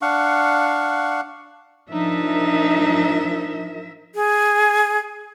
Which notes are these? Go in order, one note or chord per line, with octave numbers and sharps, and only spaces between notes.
D4 F5 F#5 C#6
F3 D4 D#4 A#4 E5
G#4